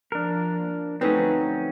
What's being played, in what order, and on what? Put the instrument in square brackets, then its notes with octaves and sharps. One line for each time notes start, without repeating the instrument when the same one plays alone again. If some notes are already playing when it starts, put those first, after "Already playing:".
[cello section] F3 A#3 [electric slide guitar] D4 A#4
[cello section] D2 F3 [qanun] F#3 A3 D#4 [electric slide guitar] C4 C#4 [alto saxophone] B4